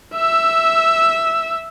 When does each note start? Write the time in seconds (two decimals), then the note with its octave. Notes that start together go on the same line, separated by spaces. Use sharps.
0.15 E5 E6